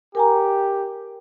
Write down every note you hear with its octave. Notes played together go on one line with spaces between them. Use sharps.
G4 A#4 G#5 A#5